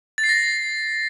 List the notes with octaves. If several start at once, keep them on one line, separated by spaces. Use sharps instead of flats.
A6
C7
A#6